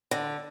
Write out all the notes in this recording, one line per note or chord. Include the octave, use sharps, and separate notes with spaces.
D3